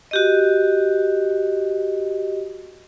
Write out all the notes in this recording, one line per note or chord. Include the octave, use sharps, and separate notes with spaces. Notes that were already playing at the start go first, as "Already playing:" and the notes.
F#4 G4 D#5